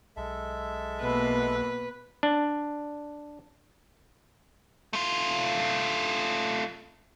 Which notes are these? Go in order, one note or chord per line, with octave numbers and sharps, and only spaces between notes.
B1 G#3 A4 E5
B2 A#3 B4
D4
A3 F4